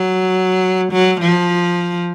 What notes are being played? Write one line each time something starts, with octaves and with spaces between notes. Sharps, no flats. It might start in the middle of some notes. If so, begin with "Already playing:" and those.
Already playing: F#3
F#3
F3